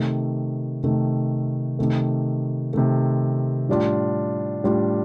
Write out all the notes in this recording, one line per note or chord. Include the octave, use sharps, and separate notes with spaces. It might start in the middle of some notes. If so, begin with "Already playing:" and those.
Already playing: C3 D#3 A3
C3 D#3 A3
C3 D#3 A3
C3 D#3 A3
A2 G3 D4 F4
A2 G3 D4 F4